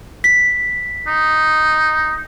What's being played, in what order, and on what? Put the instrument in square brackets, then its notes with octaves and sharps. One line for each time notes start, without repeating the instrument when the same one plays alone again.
[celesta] B6
[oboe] D#4